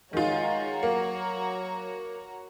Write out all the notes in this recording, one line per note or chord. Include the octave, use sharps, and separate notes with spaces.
D#3 G#3 F4 F#4 C#5 A#5
F#3 A#3